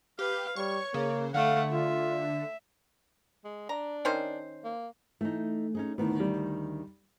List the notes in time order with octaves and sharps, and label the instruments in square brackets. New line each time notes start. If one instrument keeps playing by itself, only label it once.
[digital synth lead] G4 [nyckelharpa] B4 F5
[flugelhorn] G3 [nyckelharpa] C#5 [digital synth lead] C#6
[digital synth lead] C#3 [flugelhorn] A#3
[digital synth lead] D3 [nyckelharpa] A3 F#5 [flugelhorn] F5
[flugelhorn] F4 [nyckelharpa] E5
[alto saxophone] G#3
[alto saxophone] D4 [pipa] A#5
[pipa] D#3 C#4 C5
[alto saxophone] A#3
[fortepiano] E3 [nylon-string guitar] A3 D#4
[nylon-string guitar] C#4 D#4 G#4
[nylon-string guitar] D2 D#3 [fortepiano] A2 B3
[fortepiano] G3